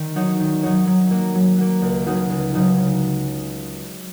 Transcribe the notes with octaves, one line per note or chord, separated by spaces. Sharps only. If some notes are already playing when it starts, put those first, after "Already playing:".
Already playing: D#3
F#3 D#4 F#4 C#5
D#3
F#3 D#4 F#4 C#5
F#3
A#3 F#4
F#3
A#3 F#4
C#2
C#3 F#3 D#4 F#4
C#2
C#3 F#3 D#4 F#4
C#3